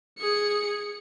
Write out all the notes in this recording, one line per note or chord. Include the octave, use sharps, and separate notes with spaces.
G#4 C#7